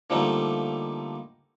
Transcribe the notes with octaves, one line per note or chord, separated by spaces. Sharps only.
D3 F3 G3 A3 A#3 D#4